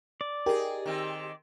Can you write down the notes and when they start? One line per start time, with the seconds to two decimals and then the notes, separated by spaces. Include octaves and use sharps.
0.21 D5
0.46 D#4 G4 G#4 A#4
0.86 D#3 C4